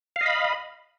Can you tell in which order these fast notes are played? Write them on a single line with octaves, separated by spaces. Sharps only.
F5 D#5 B5